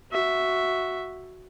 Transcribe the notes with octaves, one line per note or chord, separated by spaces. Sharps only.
F#4 E5